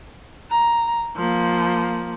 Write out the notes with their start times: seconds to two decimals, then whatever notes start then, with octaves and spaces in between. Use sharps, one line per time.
0.50 A#5
1.16 F3 A#3